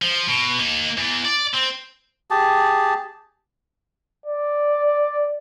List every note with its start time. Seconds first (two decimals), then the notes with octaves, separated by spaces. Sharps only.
0.02 F3
0.28 B2
0.59 A#3 D#4
0.98 E2
1.25 D5
1.54 C4
2.31 G4 G#4 A5
4.26 D5